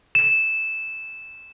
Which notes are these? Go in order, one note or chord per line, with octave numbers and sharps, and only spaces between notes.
E7